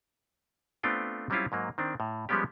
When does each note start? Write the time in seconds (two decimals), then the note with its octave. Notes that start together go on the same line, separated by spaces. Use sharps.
0.83 A3 B3 C4 D4 F4 G5
1.30 F#3 G3 C4 C#4 E4 F4
1.52 G#2 F#3 A#3
1.78 D#3 C4 D4
2.00 A2
2.29 F3 G3 G#3 B3 C#4 G4